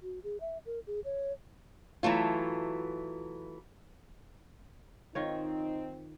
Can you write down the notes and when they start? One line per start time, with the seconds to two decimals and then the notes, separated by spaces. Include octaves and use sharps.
0.03 F#4
0.23 G#4
0.41 E5
0.66 A#4
0.87 G#4
1.05 C#5
2.03 E3 F#3 A3 F4
5.15 D#3 C4 D#4 F4 C#5